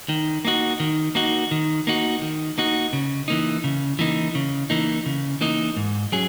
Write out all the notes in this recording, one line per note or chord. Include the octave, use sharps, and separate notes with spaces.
D#3
A#3 D#4 F#4
D#3
A#3 D#4 F#4
D#3
A#3 D#4 F#4
D#3
A#3 D#4 F#4
C#3
E3 A#3 D#4
C#3
E3 A#3 D#4
C#3
E3 A#3 D#4
C#3
E3 A#3 D#4
G#2
F#3 C#4 G#4